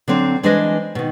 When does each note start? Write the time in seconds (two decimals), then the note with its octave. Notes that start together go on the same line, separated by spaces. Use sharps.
0.08 D3 F#3 C4 D4
0.43 E3 G#3 D4 B4 C5 D#5
0.95 B2 D#3